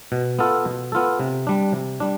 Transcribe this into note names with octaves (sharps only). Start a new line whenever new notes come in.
B2
B3 F4 A4
B2
B3 F4 A4
C3
G3 D4
C3
G3 D4